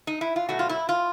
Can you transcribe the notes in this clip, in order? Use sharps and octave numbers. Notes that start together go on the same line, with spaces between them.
D#4
E4
F4
B2 F#3 A3 F#4
F4
E4
F4